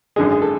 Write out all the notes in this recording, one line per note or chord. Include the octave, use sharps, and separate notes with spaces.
G#1 F#2 D3 G#3 G#4
G#4
A4